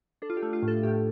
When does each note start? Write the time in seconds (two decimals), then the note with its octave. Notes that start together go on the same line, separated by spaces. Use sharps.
0.22 D4 A4
0.30 F4
0.37 G4
0.42 A3
0.53 F4
0.63 A2
0.68 A4
0.83 A2 G4